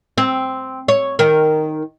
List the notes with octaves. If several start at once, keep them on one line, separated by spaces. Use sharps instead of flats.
C4
C#5
D#3 A#4